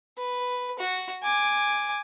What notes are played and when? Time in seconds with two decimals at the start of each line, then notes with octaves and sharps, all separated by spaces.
0.18 B4
0.79 F#4
1.23 G#5 D6